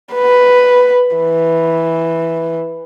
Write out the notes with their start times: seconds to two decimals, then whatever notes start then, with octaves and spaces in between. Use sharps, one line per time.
0.13 B4
1.16 E3